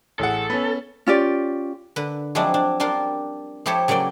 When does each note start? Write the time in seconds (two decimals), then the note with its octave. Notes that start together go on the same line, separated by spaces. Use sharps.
0.19 A1 G#4 A4 F#5
0.50 B3 C#4
1.07 C#4 F4 G4 D5
1.96 D3 B4
2.35 F3 F#3 G#3 C4 D4 E4
2.54 D4
2.80 G3 D4 F4 A#4 C5
3.66 F3 E4 G4 A4 C5 C#5
3.88 C#3 F#3 A#3 D5 G5